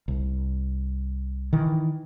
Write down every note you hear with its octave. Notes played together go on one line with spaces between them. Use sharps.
C2
D#3 E3